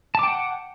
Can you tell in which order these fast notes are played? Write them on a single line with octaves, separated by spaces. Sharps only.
A5 D6 G5 F#5